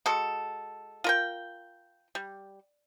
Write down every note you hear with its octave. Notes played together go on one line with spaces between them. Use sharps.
G#3 F#4 A4
F4 A#4 G5
G3